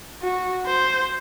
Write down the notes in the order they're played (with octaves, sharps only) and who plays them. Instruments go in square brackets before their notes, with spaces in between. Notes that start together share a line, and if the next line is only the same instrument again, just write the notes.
[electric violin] F#4
C5